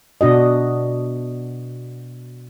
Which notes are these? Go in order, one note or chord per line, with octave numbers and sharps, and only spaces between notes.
B2 D4 F#4 D#5